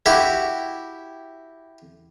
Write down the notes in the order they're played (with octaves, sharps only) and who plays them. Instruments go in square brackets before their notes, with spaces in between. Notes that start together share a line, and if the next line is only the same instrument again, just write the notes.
[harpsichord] E4 F#4 G4